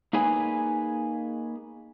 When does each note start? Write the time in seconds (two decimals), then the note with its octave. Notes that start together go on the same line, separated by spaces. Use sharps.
0.13 A#3 D#4 G#4 B4 C#5 G#5